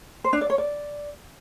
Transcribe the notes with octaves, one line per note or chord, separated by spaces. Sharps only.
C5
D4
D5
C#5
D5